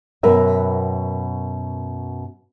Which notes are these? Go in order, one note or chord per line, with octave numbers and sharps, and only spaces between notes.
F#2 B2 A#4 B4 E5 G5